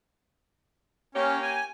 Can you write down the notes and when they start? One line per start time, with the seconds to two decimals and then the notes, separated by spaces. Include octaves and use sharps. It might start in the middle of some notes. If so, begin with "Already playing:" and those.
1.15 A#3 C#4 G4 C#5
1.43 G#5